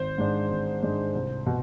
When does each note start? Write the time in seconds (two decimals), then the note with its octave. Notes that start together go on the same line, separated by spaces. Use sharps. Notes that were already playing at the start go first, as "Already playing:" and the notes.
Already playing: G#1 C5
0.18 G#2 G#3 D4
0.50 G#1
0.82 G#2 G#3 D4
1.15 C2
1.47 B2